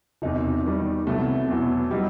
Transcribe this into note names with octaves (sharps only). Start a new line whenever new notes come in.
E1 E2 C3 D#4
E2 D#3 G3
C2 C3 F#3 A3 B3
E2 B2 F#3 B3 E4
F#3 G3 B3 D#4 G4